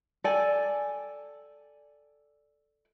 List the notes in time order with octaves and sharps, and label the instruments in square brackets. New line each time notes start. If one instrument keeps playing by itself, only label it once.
[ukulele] A4 D5 G5 G#5